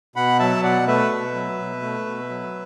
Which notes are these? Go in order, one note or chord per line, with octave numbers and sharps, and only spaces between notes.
B2 F#5 B5
F#3 E5 A5
B2 D5 F#5
A3 B4 E5
B2
F#3
B2
A3
B2
F#3